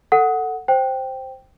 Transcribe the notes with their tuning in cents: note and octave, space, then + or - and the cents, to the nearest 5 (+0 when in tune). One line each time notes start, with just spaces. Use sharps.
A4 +15 F#5 +0
C5 +0 G5 +0